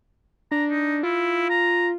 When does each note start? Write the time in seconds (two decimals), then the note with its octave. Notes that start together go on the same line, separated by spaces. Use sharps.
0.52 D4 A#5
0.70 D#4
1.03 E4 F4
1.50 A#5